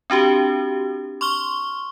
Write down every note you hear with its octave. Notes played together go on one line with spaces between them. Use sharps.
C4 D4 F#4 G4
C6 C#6 F6 G7